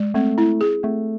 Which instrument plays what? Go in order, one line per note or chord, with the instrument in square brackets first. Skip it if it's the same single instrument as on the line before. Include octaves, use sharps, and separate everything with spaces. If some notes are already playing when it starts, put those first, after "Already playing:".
Already playing: [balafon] G#3
[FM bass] A3 [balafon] C4
[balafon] E4
G#4
[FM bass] A3 [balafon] C4